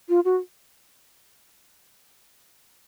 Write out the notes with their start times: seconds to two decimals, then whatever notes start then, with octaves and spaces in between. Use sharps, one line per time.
0.09 F4
0.25 F#4